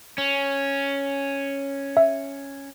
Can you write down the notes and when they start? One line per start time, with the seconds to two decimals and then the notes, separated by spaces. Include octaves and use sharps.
0.18 C#4
1.97 E5